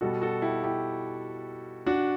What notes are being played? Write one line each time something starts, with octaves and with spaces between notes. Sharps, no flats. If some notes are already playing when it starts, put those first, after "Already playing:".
B2 G3 F#4 A4
F#4 A4
E4 G4
E4 G4
D4 F#4